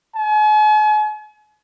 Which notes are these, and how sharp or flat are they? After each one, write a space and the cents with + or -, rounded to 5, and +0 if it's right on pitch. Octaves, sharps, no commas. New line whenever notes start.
G#5 +45